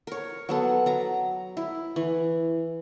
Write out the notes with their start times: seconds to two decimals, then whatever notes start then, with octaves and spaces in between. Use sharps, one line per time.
0.07 A#4 C#5
0.49 F#3 B3 A4
0.86 F#3 A#5
1.57 E4
1.96 E3